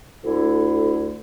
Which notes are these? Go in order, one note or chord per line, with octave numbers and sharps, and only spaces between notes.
D2 D3 A3 E4 A4